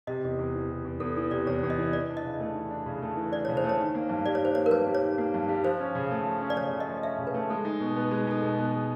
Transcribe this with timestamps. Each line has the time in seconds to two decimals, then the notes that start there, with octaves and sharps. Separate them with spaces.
0.07 C3 D#5
0.24 E2
0.38 E2
0.54 E3
0.69 C3
0.85 E2
1.00 E2 A4
1.16 E3 A4
1.31 C3 D5
1.47 E2 C#5
1.63 E2
1.70 D#5
1.78 E3
1.93 E3 D5
2.09 D4
2.17 D#5
2.25 C#3
2.40 A3
2.55 E3
2.71 D4
2.86 C#3
3.02 A3
3.16 E3
3.32 D4 D5
3.45 C#3 C#5
3.57 C5
3.64 A3
3.69 C#5
3.79 D#3
3.95 A#3
4.09 G2
4.25 G3 D5
4.35 C#5
4.41 D#3 C5
4.55 A#3 C#5
4.66 A#4
4.71 G2 B4
4.86 G3
4.95 C#5
5.03 D#3
5.18 A#3
5.34 G2
5.48 G3
5.64 F3 C5
5.80 C#4
5.95 C#3
6.11 A3
6.26 F3
6.41 C#4
6.50 D5
6.57 C#3 C#5
6.73 A3
6.80 D#5
6.89 F3
7.03 C#4 E5
7.19 C#3
7.27 B4
7.34 A3
7.50 G#3 A4
7.65 D#4
7.80 B2
7.96 B3
8.11 G#3
8.27 D#4 A4
8.42 B2 G#4
8.58 B3
8.74 G#3